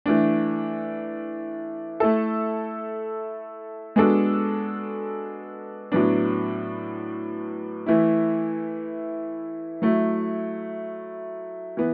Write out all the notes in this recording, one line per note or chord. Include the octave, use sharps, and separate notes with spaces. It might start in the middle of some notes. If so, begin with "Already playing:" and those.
E3 A3 D4
A3 E4 A4
G#3 B3 D4 F#4 A4
A2 F#3 B3 D4
E3 A3 E4
F#3 A3 E4
E3 B3